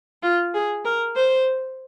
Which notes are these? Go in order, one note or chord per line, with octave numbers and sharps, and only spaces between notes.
F4
G#4
A#4
C5